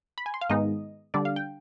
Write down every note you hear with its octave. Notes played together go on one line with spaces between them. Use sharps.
B5
G#5
C6
F5
G#2 D#3 G#3 B3 D#4 D#5
D3 G3 D4 D5
F5
G5